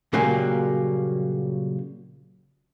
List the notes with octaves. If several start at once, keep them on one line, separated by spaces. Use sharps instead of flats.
A#2 C#3 F#3 G3 A#3